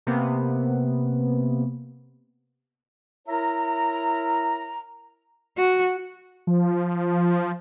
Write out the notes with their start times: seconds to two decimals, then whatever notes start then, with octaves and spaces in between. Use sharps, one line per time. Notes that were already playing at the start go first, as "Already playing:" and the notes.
0.07 C3 A#3 B3
3.28 E4 A#4 C#5 E5 A#5
5.58 F#4
6.47 F3